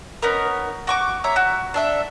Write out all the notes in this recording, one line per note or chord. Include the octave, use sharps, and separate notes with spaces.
B3 C#4 D#4 A#4
F#4 C#6 D6
C#5 E5 A#5
F#4
D4 A4 E5